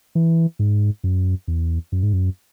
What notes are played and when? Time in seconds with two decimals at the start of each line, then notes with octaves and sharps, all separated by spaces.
0.15 E3
0.59 G#2
1.04 F#2
1.48 E2
1.92 F#2
2.03 G#2
2.13 F#2